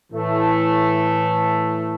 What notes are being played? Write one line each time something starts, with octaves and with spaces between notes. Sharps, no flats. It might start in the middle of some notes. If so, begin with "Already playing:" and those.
A2 E3 A3